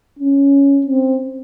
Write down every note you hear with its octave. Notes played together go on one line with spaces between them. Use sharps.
C#4
C4